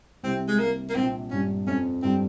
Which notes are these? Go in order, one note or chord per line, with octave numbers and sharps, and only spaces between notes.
C2 C3 C4
G#3
A#3
A#3
A#1 A#2 C4
G2 C#4
F2 C#4
G2 C4